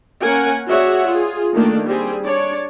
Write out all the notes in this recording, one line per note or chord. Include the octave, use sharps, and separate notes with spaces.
A#3 C#4 A#4 F#5 G#5
F#4 G#4 C#5 D5 E5 F#5
F4 G#4
D#3 A3 A#3 D4
G3 C4 G#4
D4 C#5 D5